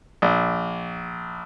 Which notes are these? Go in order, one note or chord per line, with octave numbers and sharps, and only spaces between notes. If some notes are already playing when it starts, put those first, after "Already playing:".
A#1